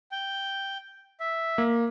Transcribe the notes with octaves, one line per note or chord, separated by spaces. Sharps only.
G5
E5
A#3